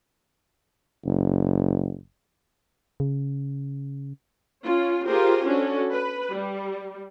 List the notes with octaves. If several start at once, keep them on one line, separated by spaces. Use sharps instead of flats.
F#1
C#3
C#4 F4
F4 G4 G#4 A#4 C5
C#4 D4 F#4 A4
B4
G3